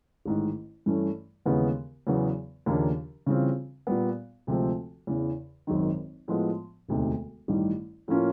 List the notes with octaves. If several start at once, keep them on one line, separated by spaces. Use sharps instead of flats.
A1 G#2 D#3
G2 E3 A3 C#4
D#2 C#3 E3 G#3 B3
E2 C#3 F#3 B3
D#2 C#3 F3 A#3 D4
C#3 E3 G3 C4 F4
A#2 G3 B3
D2 C3 F3 G#3 C4
E2 C#3 E3
G#1 F#2 D#3
A2 F3 G#3 B3
E1 D2 C3 D#3
A1 G2 D#3 G3
A2 F3 A#3 C#4 F4